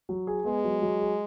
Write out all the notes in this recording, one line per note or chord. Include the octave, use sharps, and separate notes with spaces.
F#3
G#4
G#3 B3
F#3
F#3
G#4